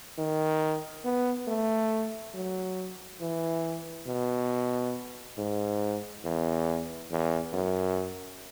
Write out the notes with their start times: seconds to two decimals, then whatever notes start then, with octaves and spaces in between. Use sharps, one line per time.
0.18 D#3
1.04 B3
1.48 A3
2.34 F#3
3.21 E3
4.07 B2
5.38 G#2
6.24 E2
7.11 E2
7.53 F#2